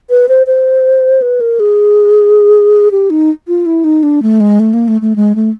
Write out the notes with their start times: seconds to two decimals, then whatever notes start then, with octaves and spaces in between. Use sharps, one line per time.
0.10 B4
0.29 C5
0.47 C5
1.22 B4
1.40 A#4
1.60 G#4
2.91 G4
3.10 D#4
3.48 F4
3.66 E4
3.84 D#4
4.03 D4
4.22 A3
4.40 G#3
4.59 A3
4.73 A#3
4.88 A3
5.01 A3
5.16 G#3
5.35 A3